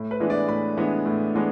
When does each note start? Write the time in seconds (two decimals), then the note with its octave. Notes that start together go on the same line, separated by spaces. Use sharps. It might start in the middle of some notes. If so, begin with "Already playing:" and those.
Already playing: A2
0.11 B4
0.20 E3 G#3 B3 D4
0.30 D5
0.48 A2 B5
0.77 E3 G#3 B3 D4
1.05 A2
1.34 E3 G#3 B3 D4